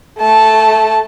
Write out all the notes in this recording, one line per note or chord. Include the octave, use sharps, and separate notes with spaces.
A3 A5